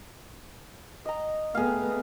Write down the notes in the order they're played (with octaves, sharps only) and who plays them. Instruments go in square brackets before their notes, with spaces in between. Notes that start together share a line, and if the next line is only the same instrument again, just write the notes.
[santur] D#5 A#5
[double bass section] A3 B3 [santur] G#4 F5